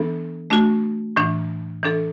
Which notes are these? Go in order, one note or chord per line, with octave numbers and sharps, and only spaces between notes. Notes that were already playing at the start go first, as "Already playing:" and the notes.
Already playing: E3 B3 D4 A4
A3 D4 F#4
A2 E3 D4
E3 D4 A4